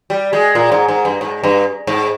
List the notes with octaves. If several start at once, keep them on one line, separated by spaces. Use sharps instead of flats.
G3
G#3
A#2
G#2
G#2
G2
G#2
G2
G#2